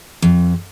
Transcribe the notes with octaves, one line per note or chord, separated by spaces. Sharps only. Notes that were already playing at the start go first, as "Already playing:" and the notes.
F2